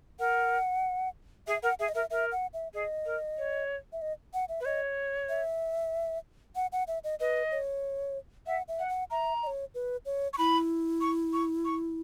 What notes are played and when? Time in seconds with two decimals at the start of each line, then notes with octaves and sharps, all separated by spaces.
0.19 A#4 F#5
1.47 G#4 E5
1.63 A#4 F#5
1.80 G#4 E5
1.89 D#5
1.95 A#4 E5
2.10 A#4 E5
2.32 F#5
2.53 E5
2.74 G#4 D#5
3.06 A#4
3.38 C#5
3.93 E5
4.02 D#5
4.34 F#5
4.49 E5
4.61 B4
4.65 C#5 D#5
5.29 E5
6.56 F#5
6.72 F#5
6.88 E5
7.04 D#5
7.20 B4 D#5
7.52 C#5
8.46 E5 F#5
8.68 E5
8.79 F#5
8.89 F#5
9.11 E5 A#5
9.43 D#5
9.47 C#5
9.75 B4
10.06 C#5
10.33 C#6
10.38 E4 B5
11.01 C#6
11.33 C#6
11.65 C#6